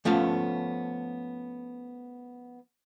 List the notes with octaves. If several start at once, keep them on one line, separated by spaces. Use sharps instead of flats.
F3 A3 B3 C#4 F5